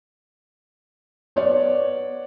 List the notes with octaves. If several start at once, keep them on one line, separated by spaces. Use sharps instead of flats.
B3 C#5 D5